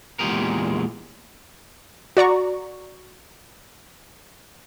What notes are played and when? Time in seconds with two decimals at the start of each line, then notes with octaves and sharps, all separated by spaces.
0.19 E2 A#2 G#3 G4 G#4 A#4
2.17 F#4 D5 A#5 C#6